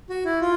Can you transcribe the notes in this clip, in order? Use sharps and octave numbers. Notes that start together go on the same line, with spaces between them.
F#4
E4
F4